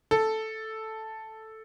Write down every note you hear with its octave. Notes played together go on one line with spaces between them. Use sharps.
A4